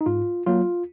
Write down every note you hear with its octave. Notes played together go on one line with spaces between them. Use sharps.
D#4
G#2 F4
F#3 A#3 F4